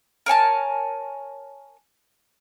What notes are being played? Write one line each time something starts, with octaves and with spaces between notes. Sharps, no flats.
A#4 C#5 G#5 A5